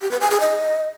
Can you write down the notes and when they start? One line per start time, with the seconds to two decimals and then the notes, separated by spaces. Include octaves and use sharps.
0.02 G4
0.11 B4
0.21 G#5
0.31 G#4
0.40 D#5